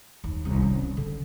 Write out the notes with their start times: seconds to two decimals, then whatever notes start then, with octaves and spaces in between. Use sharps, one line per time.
0.24 D#2
0.45 C2
0.62 C#4
0.97 D3